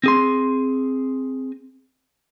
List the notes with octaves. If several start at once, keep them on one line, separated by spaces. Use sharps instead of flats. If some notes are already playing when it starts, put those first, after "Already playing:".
C4 G#4 C6